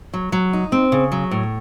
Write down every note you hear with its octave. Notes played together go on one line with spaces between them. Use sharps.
F#3
F#3
D#4
C4
C#3
F#3
A2